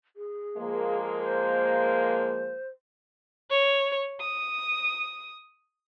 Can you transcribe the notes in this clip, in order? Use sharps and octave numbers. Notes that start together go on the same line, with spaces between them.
G#4
F3 G#3 A#3
C5
C#5
D#6